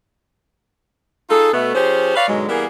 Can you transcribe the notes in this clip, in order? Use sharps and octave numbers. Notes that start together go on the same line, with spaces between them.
D#4 F4 G#4 A4
B2 A3 B3
F3 C#4 G4 G#4 C5
B4 C#5 D5 F5
G#2 B2 D3 F#3 G#3
E3 G3 A#3 B3 G#4 A#4